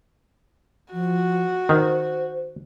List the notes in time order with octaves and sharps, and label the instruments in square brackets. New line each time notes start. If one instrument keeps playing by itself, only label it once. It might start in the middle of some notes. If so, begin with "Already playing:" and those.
[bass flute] F3 [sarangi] F#4
[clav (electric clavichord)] D#3 [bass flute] C5